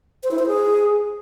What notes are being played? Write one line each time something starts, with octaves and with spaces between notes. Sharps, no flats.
C5
E4
C5
G#4